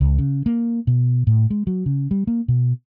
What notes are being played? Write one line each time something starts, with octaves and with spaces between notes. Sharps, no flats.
C#2
C#3
A#3
B2
A2
G#3
F#3
C#3
G3
A#3
B2